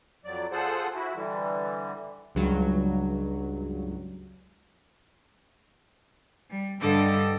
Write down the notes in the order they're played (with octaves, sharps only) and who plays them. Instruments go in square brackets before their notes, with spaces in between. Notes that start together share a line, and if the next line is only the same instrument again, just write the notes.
[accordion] F2 F#3 D5
F4 G#4 A4 C5 F#5
E4 F#4
D3 E3 G3
[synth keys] C#2 G2 F#3
[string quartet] G3
G2 D3 G3 A4 D#5 D6